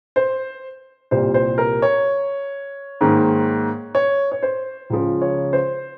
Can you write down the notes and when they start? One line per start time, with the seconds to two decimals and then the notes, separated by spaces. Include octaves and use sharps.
0.16 C5
1.11 C2 A#2 G3 C5
1.34 C5
1.58 A#4
1.82 C#5
3.01 G#2 D#3 A#3
3.95 C#5
4.32 C#5
4.43 C5
4.90 C#2 C#3 F3
5.22 C#5
5.53 C5